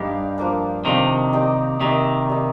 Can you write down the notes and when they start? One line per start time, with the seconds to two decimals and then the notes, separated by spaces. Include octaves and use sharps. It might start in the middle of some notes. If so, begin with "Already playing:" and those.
Already playing: G2 D#4 G4 D5 F5
0.38 F3 A#3 D4
0.85 C3 D#3 F3 A#3 D4
1.33 A#3 D#4 G4 D5
1.80 C3 D#3 A#3 D#4 G4 D5
2.29 G3 A#3 D#4